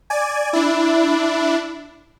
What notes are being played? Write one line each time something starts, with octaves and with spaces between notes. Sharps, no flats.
D5 G#5
D4 E4